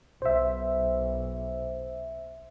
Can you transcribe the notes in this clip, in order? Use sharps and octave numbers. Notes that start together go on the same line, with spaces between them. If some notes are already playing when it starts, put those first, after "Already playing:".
B1 C5 E5